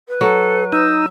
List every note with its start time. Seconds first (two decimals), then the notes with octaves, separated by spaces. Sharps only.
0.08 B4
0.21 F#3 A4
0.72 D#4 E6